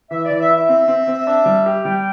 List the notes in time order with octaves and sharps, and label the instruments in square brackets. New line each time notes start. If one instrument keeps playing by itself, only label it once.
[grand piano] E3 [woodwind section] E5
[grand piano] E3 [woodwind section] D5
[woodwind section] E5
[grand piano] E4 [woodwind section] E5
[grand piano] C4
C4
C4
D4
G3
G4
[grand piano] G3 [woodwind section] G5